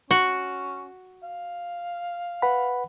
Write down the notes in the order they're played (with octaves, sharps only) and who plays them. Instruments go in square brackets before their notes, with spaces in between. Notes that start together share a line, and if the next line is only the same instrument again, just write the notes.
[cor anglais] C#4 [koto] F#4
[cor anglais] F5
[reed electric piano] B4 F#5 B5